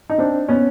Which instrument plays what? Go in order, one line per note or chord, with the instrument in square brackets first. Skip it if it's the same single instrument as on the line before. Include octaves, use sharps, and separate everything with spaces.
[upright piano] D#4
C4 D4
B3 C#4